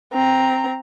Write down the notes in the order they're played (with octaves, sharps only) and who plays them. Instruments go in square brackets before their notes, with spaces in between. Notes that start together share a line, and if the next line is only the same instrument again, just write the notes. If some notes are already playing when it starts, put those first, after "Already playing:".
[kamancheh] C4 A#5